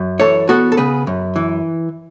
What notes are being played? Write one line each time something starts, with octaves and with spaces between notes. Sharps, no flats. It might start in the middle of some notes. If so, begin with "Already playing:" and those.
Already playing: F#2
E3 A4 C#5
B3 F#4 A4
A4
C#3 G#4 B4
F#2
E3